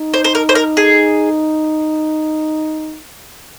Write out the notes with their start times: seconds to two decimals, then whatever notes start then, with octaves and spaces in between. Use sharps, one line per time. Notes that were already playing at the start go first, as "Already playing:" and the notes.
Already playing: D#4
0.14 C5
0.24 C5
0.35 A#4
0.49 C5
0.55 A#4
0.77 G#4